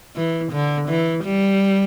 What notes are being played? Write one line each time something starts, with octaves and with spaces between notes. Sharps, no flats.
E3
D3
E3
G3